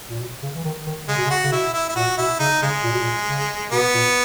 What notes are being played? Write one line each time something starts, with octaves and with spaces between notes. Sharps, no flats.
A#2
B2
C#3
E3
D#3
D#3
C#3 G#3
B2
C#3
F#4
C#3
B2 E4
E4
E4
A#2 F#4
B2 E4
C#3 D#4
C#3 G#3
A#2
B2
A#2
C#3
B2 B3
A#2